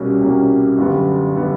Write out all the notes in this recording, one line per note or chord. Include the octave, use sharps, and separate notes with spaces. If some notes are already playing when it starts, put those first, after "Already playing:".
Already playing: C2 B2 G3 A#3 C#4
C2 B2 G3 A#3 C#4
G1 F#2 D3 G3 B3
D3 G3 B3